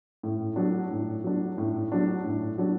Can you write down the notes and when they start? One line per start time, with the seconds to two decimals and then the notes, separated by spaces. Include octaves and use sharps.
0.23 A2
0.56 F#3 D4
0.91 A2
1.24 F#3 D4
1.58 A2
1.92 F#3 D4
2.24 A2
2.58 F#3 D4